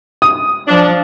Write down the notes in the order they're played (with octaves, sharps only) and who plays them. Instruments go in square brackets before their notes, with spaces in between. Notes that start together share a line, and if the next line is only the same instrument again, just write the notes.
[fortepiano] D#6
[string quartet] F3 [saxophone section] D4